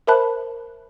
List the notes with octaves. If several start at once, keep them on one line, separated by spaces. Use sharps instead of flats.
A#4 C5 E5 A5 B5 F#6